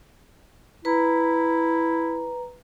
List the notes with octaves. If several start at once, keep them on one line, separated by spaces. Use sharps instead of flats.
E4 B4 A#5